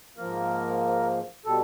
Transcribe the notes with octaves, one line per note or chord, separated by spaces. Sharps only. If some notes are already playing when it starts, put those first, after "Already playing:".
G#2 F3 A#3 A#4
B2 G3 A4